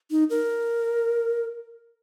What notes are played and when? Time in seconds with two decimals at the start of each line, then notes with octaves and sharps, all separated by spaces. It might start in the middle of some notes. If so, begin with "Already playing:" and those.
0.11 D#4
0.30 A#4